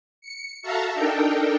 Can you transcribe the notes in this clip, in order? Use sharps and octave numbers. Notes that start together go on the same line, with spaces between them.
C#7
F#4 A4 E5 F5 A5 A#5
D4 D#4 A4 A#4 G5